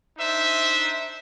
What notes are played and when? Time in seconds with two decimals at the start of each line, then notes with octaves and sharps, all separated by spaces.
0.17 D4 D#4 C5 E5